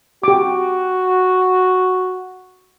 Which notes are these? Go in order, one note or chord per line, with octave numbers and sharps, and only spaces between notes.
F#4 G4 D6